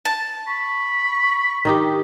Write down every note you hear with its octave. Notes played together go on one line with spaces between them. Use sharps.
A5
B5 C#6
D#3 D#4 G4